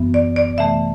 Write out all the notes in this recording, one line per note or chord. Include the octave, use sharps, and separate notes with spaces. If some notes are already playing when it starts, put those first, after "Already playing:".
Already playing: F#2 E3 B3
D5
D5
C3 E3 A3 E5